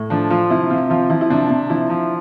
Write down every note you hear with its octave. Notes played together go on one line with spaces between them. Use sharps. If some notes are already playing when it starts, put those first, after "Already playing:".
Already playing: A2
F3 D4
F3 F4
C3 E4
C3 F4
F3 F4
F3 E4
E4
C3 D4
C3
F3 E4
F3